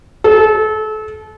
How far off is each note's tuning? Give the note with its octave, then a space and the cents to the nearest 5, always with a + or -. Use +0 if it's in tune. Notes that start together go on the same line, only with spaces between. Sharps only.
A4 -30